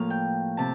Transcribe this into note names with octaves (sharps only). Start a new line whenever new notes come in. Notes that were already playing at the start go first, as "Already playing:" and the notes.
Already playing: A2 F3 A#3 F5
G5
C3 A5